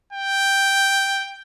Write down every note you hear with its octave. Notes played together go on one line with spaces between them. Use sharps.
G5